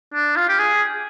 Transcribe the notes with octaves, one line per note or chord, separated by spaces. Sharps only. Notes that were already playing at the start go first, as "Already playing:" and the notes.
D4
F4
G4
G#4